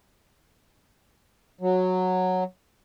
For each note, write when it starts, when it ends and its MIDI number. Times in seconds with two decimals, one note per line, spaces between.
1.61 2.44 54